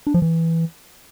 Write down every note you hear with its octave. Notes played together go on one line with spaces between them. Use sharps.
D4
F3
E3